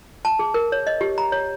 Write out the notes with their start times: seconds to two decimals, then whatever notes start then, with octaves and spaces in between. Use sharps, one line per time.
0.25 A5
0.39 G#4
0.54 A#4
0.72 C#5
0.87 D#5
1.01 G4
1.18 A#5
1.32 C#5